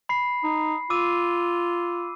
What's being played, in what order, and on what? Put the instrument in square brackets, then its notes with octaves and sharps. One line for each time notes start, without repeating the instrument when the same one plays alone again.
[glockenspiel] B5 C7
[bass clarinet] D#4
[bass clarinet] F4 [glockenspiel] D6 E6 D#7